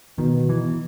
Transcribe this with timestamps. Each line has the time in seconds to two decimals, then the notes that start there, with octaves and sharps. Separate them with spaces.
0.18 B2 D#3
0.49 E3